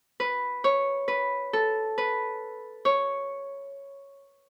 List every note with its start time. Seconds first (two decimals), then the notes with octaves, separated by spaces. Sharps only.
0.20 B4
0.64 C#5
1.08 B4
1.53 A4
1.98 B4
2.85 C#5